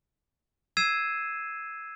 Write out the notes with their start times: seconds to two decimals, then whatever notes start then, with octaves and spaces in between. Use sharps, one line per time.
0.77 E6 G#6 C7 D#7 E7